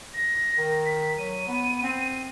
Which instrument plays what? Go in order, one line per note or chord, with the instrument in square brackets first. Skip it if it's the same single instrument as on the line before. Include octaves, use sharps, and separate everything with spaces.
[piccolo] A#6
[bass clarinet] D#3
[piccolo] B6
[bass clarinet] F#3 [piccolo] D#7
[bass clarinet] B3
C4